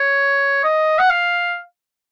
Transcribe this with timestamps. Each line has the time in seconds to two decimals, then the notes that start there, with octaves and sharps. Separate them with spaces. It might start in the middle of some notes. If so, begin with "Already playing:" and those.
Already playing: C#5
0.64 D#5
0.99 F#5
1.10 F5